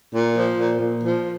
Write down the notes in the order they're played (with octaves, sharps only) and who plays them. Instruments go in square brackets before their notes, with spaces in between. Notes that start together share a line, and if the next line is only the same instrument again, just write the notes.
[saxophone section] A#2
F3
A#2
A#2
F3